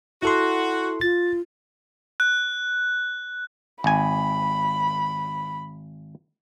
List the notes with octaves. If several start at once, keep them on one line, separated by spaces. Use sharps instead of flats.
E4 F#4 A4 C6
F4 A6
F#6
G#1 G#5 B5